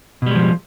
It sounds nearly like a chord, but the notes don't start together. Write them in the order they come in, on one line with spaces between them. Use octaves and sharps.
B2 G3 G#3 F3